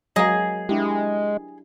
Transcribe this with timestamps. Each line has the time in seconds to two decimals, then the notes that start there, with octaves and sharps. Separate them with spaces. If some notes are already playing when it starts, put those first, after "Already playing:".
0.16 F#3 G#3 A#3 G#4 D#5
0.69 G#3 D4 E4 G4